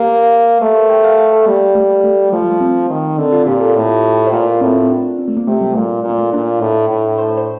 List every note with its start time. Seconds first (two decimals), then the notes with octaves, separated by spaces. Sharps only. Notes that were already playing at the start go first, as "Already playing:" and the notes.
Already playing: A#3 G4
0.61 A3 A#4
0.75 C5
0.90 G5
1.04 F5
1.18 F5
1.33 A4
1.46 G3 A#3
1.75 A3
2.04 A3
2.32 F3 A3
2.42 G3
2.51 A3
2.61 C4
2.90 D#3
3.18 D3 C4
3.32 F4
3.46 A#2 G4
3.60 A4
3.76 A2
4.27 C5
4.32 A#2 A#4
4.47 F4
4.61 A2 C4
4.75 C4
4.90 D4
5.19 C4
5.28 A3
5.37 A#3
5.47 C3 A3
5.61 G3
5.75 A#2 A3
6.04 A#2
6.10 A#3
6.18 A3
6.33 A#2 D4
6.61 A2
6.90 A2
7.18 C5
7.37 C5